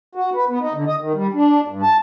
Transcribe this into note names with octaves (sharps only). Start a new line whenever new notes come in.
F#4
B4
B3
D#4
D3
D#5
D#3
G3
D4
G2
A5